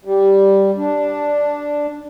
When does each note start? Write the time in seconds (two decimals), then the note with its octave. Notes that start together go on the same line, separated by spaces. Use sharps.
0.05 G3
0.77 D4